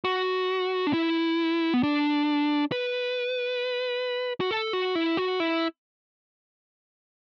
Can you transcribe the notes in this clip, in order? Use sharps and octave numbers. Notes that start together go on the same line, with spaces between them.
F#4
D4
E4
B3
D4
B4
F#4
A4
F#4
E4
F#4
E4